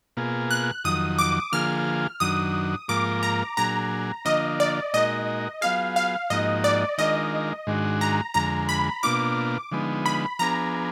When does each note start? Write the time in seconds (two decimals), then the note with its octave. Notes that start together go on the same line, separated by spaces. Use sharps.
0.17 B2 A#3 F4 G#4
0.51 F#6
0.84 F2 D#3 F#3 D#6
1.19 D6
1.52 D3 F3 A#3 F4 G#4 F6
2.20 F#2 D#3 F#3 D4 D#6
2.88 G#2 F3 A#3 F4 A#4 D6
3.23 A#5
3.57 A#2 F#3 D4 G#4 A#5
4.25 D3 F3 A#3 D4 F4 D#5
4.60 D5
4.94 A#2 G#3 D#4 F#4 A#4 D#5
5.61 F#3 B3 F4 G#4 F5
5.96 F5
6.30 G#2 F3 A#3 D#4 F#4 D#5
6.64 D5
6.98 D#3 G#3 D4 F4 A#4 D#5
7.67 G#2 D#3 G#3 D4 F#4
8.01 A#5
8.34 F2 D3 G#3 A#5
8.69 B5
9.03 B2 A#3 D4 F4 D6
9.71 D3 F3 G#3 B3 D#4
10.06 B5
10.39 F3 B3 D4 G#4 A#5